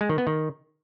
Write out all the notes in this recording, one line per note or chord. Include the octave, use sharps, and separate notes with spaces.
G#3
D#3
B3
D#3